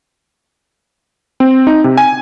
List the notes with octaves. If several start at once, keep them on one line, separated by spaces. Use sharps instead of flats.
C4
D#4
C3
G#5